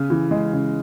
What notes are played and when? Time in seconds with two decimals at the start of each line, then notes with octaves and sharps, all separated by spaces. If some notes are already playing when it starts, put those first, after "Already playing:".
Already playing: C#3
0.10 E3
0.31 G#3
0.53 C#3